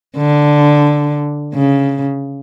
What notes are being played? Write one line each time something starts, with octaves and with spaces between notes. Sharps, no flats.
D3
C#3